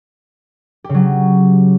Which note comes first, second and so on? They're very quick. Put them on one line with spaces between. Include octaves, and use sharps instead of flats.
G4 C#3 F#3